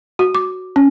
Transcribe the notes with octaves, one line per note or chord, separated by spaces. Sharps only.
F#4
D6
C#4